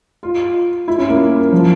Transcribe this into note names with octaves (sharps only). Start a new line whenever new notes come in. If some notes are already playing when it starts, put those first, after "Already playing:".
F4
E4
C#4
A#3
F3